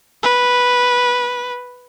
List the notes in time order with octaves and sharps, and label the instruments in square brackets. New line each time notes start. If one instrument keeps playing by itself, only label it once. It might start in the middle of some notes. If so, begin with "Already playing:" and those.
[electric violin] B4